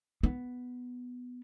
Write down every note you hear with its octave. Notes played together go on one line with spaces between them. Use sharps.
B3